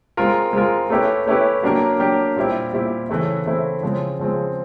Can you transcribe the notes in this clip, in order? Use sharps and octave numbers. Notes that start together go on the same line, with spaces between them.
G#3 C4 F4 A#4
G#3 C4 F4 A#4
A3 C#4 E4 G4 B4
A3 C#4 E4 G4 B4
F#3 A#3 D4 G4 A#4
F#3 A#3 D4 G4 A#4
A#2 G3 C4 E4 G4
A#2 G3 C4 E4 G4
C#3 E3 A3 C4 E4
C#3 E3 A3 C4 E4
C#3 F3 G#3 C4
C#3 F3 G#3 C4